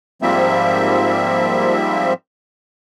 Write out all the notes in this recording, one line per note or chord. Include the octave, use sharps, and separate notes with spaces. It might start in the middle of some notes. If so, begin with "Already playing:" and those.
G#2 F3 G3 A#3 C4 E5